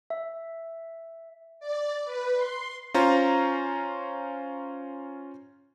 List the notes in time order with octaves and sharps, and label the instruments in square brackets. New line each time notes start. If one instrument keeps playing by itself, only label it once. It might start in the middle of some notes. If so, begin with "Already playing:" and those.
[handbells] E5
[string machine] D5
B4
C6
[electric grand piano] C#4 F4 C5 A#5